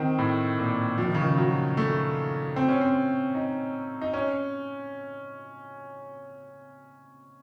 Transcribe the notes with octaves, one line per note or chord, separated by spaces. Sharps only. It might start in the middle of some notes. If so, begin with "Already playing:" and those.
Already playing: D#3 C4
A2
A#2
F3
D#3
C#3
D#3
F#3
A3
C4
C#4
C4
D#4
D#4
C#4